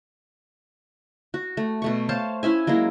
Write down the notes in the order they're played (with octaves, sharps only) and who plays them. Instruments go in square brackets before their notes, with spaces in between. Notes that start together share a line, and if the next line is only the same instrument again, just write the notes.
[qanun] F#4
A3
B2 A3 C#6
C5 C#5 F5 A5
C#4 E4 E5 G#5
F#3 G#3 A#3 E4